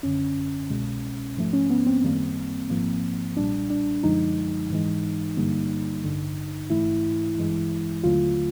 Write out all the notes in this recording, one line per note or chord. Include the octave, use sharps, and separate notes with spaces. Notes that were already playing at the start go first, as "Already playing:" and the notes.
G#1 F#2 D3 C#4
C2 B2 G#3
G#2 F3 A3
C#4
B3
C4
F#2 D#3 G3 A#3
G#1 G#2 F3 A#3
B1 A#2 G3 D4
D4
F#2 D3 F3 G#3 D#4
G#2 E3 G#3
G2 D3 G3 A#3
A1 G2 D3
A1 G#2 E3 A3 E4
G#1 G2 E3 G#3
D#2 D3 F#3 A3 F4